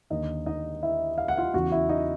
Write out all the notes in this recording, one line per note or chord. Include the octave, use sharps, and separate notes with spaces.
D#2 D3 D#4 D#5
D#4 D#5
E4 E5
F5
F#5
F4 F5
E2 C#3 E3 F#4 F#5
E4 E5
D#4 D#5